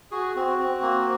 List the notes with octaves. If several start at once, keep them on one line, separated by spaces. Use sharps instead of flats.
F#4 G#4
C4 F#4
C4
A#3